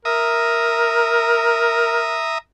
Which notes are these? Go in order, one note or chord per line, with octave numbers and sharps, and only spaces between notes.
A#4 E5 A#5 D#6